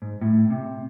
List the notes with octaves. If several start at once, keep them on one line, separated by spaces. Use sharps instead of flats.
G#2
A2
C3